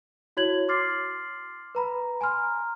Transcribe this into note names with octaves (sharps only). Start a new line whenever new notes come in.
E4 F#4 C#5 G#6 F#7
C6 D6 F6 A6 C7
B4 A#5 B5
G#5 A#5 C6 F6